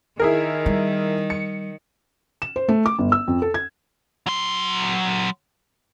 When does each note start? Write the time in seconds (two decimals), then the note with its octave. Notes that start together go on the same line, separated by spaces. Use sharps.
0.19 D#3 E4 G#4 A#4
0.66 G3
1.30 C#7
2.42 E7
2.56 C5
2.69 A3
2.86 D6
2.99 G1
3.12 E6
3.28 F2
3.42 A4
3.54 G#6
4.26 F#3 C6